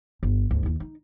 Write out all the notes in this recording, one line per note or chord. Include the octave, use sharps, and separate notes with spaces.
G1
D2 G#2
D#2 E4
D#4